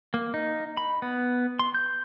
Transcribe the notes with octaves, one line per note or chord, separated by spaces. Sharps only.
A#3
D#4
B5
B3
C6
G6